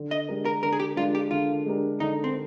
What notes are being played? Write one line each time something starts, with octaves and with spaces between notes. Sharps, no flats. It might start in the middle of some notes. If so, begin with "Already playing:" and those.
Already playing: D3
D#5
G#3 D4 G4 A#4
A#4
D3 A#4
G#4
G4
G#3 D4 F4 G4 A#4
G4
D3 F4
G#3 D4 G4 A#4
D3 D#4
C4